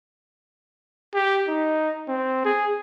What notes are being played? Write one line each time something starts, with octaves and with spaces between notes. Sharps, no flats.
G4
D#4
C4
G#4